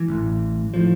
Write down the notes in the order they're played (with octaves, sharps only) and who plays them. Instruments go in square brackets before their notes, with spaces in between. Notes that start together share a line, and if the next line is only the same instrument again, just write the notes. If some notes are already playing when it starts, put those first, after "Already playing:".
Already playing: [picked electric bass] E3
A1 A2
A2 F3